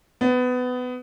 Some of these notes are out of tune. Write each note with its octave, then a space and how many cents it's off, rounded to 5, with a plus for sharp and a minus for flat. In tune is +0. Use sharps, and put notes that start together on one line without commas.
B3 +20